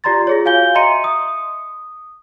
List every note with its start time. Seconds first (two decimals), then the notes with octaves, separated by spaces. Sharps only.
0.04 F4 G4 D5 A#5 C6 A6
0.27 F4 G#4 C#5
0.45 F#4 F5 G#5 G6 G7
0.75 D#5 E5 A#5 C6 C#7 D#7
1.04 D#6